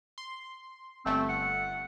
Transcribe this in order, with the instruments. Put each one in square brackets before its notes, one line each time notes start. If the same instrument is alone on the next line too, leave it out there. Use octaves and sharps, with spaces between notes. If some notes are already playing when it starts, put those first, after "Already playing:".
[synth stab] C6
[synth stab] G1 A3 [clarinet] C4
[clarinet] F#5